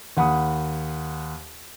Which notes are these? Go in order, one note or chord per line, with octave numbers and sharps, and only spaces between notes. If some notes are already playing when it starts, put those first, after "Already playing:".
D#2 F#5 B5 D#6